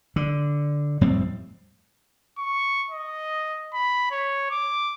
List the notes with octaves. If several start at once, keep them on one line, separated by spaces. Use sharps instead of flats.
D3
F2 A2 G3 C4
C#6
D#5
B5
C#5
D6